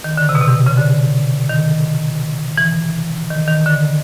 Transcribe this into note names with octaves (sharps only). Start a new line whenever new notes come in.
D#3
D3
C3
B2
C3
C#3
D3
D#3
E3
D#3
D#3
D3